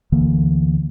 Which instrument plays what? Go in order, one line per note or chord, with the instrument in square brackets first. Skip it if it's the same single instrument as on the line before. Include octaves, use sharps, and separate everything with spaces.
[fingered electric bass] D2 D3 E3 A#3